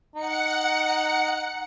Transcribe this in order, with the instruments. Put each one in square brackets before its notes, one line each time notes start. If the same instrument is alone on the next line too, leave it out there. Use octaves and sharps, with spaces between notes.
[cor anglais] D#4 [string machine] F#5 C#7